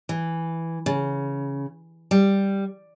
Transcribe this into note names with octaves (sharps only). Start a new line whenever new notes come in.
E3
C#3
G3